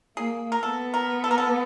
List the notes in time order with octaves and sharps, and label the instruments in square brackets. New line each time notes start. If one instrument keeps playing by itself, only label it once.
[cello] A#3 [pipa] G#4
[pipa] A#4
[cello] B3 [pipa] A4
[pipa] A#4
A4
A#4
A4